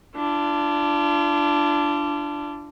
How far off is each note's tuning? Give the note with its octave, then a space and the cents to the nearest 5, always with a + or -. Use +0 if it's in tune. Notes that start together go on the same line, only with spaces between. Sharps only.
D4 +0 F4 -40